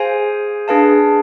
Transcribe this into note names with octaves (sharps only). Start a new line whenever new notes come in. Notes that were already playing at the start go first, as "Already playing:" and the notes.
Already playing: G#4 C5 F5 G#5
D4 G#4 B4 F5 A5